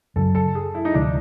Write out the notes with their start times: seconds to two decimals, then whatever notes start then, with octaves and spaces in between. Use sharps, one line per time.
0.16 F#2 C#3 F#3 A4
0.35 A4
0.55 G#4
0.75 E4
0.85 D#4
0.94 D2 C3 F3 G#3 D4